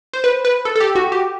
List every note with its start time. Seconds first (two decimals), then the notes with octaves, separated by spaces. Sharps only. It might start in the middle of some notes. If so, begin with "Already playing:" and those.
0.13 C5
0.24 B4
0.45 B4
0.65 A4
0.76 A4
0.80 G4
0.95 F#4
1.12 G4